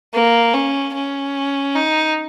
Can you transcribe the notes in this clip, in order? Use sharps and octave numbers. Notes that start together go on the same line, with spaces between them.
A#3
C#4
C#4
D#4